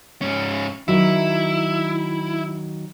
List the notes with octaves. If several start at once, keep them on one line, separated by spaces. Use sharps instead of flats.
G#2 C#4
D#3 F#3 E4